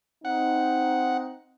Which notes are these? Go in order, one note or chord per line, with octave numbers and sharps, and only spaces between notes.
C4 D#4 F#5